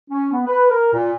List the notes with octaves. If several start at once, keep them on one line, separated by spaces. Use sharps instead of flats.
C#4
B3
B4
A#4
A#2